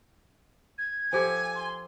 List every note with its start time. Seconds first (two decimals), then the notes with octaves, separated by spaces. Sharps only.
0.78 G#6
1.13 F3 G4 A4 G#5
1.55 C6